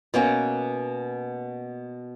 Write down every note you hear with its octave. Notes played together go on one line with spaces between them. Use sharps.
B2 A#3 C#4